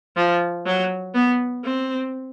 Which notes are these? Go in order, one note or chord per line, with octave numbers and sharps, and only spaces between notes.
F3
F#3
B3
C4